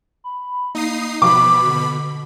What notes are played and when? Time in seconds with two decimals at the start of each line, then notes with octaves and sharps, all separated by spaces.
0.24 B5
0.75 A#3 D#4 D#6 C7
1.22 B2 F3 B5 D6
1.65 D3